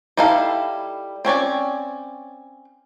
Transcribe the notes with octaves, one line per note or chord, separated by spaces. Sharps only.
G3 D#4 E4 A4 F5
C4 C#4 C#5 D5